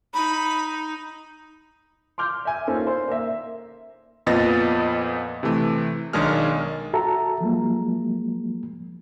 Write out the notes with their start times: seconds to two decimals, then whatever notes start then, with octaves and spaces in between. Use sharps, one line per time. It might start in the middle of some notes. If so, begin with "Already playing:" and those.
0.14 D#4 B5
2.18 C6 D6 F6 G6
2.45 E5 G#5
2.67 A#3 C#4 D#4 F4 A4 C5
2.87 C5
3.08 A#3 E5
4.26 F2 A#2 B3 D#5 A6 A#6
5.43 C3 E3 A3
6.13 B1 D#3 G#3 D4 G#4 F6
6.93 F#4 A4 E5 A5 A#5
7.41 F3 F#3 G#3 A#3